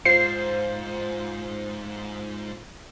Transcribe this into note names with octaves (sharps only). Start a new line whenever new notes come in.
G#2 F4 C5 C7